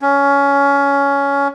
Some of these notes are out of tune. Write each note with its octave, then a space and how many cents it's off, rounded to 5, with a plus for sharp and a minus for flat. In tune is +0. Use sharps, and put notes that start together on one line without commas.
C#4 +15